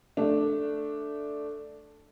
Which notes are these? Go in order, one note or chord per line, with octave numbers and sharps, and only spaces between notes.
A3 D4